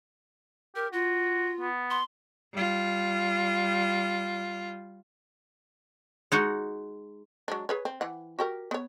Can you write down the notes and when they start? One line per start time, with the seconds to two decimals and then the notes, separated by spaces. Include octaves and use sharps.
0.75 G4 A#4
0.93 F4 F#4
1.60 B3
1.90 C6
2.53 G3 F4
6.32 G#3 D#4 F#4
7.48 F#3 G#3 D4
7.69 G#4 B4 C#5
7.85 C4
8.01 E3 F#5
8.39 F#4 G4 A#4
8.71 B3 C#5